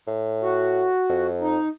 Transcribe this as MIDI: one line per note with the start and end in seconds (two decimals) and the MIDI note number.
0.07 0.90 45
0.42 1.27 66
1.09 1.58 41
1.41 1.69 63